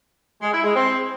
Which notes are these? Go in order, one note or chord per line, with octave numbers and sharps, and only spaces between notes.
G#3
E4
G#3
C4